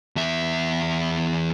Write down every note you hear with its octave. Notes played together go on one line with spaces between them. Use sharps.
E2 E5